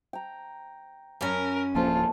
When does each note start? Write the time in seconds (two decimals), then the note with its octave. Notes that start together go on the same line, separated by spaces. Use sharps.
0.13 G5 A#5
1.21 F#2 C#4 A#4 G#5 B5 C#6
1.75 D1 F3 A#3 F4 G#4 A4 C5